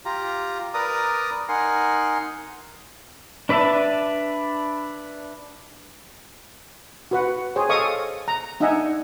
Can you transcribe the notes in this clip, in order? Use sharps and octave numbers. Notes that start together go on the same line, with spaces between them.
F4 G4 A#5
A#4 B4 D5 A#5 D#6
D#4 A#4 F#5 G#5 C6
D4 B4 D5 E5 A5
F#4 B4 F#5
G#4 C5 C#5 G5
A4 D#5 F5 C#6 D#6
A#5
D4 D#4 D#5 E5 F#5 G#5